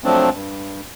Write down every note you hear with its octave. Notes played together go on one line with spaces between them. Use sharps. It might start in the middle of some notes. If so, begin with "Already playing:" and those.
F3 F#3 A3 C4 D4
G2